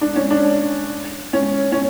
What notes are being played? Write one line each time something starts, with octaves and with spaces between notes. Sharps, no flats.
D4
C#4
D4
C#4
C#4